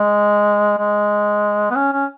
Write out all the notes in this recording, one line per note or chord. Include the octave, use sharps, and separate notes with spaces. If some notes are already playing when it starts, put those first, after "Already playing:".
Already playing: G#3
G#3
B3
C#4
C#4